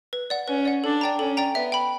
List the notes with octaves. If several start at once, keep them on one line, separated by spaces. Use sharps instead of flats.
B4
D5 F#5
C#4 B4
D5 F#5
D4 A4
D5 G5 A#5
C#4 A4
D5 G5 A#5
B3 E5
G5 B5